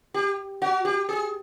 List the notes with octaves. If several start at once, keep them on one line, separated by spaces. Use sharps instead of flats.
G4
F#4
G4
G#4